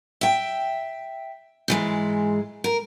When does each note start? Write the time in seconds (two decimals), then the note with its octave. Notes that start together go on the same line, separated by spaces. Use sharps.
0.21 E5 G5
1.68 G#2 E3 G#3
2.64 A#4